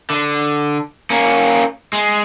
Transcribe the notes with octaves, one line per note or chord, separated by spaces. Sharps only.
D3
A#3 C#4
G#3